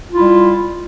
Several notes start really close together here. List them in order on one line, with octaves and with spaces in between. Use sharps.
F4 E4 G3